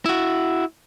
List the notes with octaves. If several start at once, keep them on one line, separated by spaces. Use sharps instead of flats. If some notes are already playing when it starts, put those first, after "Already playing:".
E4 F#4